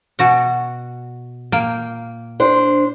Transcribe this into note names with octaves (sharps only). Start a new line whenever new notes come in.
B2 F#4 F#5
A#2 A#3 G5
D4 C5